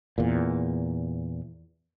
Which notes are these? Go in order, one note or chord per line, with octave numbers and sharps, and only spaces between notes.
E2 A#2